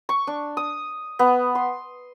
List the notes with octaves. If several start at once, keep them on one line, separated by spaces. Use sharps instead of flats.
C#6
D4
D#6
B3
C6